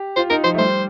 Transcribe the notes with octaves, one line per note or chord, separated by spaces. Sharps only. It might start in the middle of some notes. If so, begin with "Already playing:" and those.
Already playing: G4
F4 C5
D#4 A#4
F3 C5
A3
G3 C5